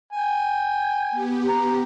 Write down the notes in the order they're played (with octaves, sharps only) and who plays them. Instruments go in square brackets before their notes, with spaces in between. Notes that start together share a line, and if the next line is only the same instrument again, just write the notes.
[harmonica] G5 G#5
[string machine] B3 G4
[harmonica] A#5